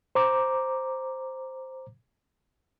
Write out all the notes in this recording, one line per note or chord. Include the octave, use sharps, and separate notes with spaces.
C5 A#5 D6